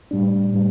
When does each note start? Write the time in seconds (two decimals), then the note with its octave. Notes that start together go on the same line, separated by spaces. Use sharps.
0.11 A2 G3 D4
0.53 A2 G3